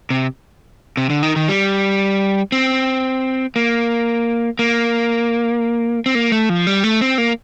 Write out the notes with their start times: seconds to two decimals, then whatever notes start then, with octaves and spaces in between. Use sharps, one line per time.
0.10 C3
0.97 C3
1.10 D3
1.23 D#3
1.36 D#3
1.48 G3
2.52 C4
3.56 A#3
4.59 A#3
6.06 C4
6.15 A#3
6.32 A3
6.49 F3
6.67 G3
6.84 A3
7.01 C4
7.18 A#3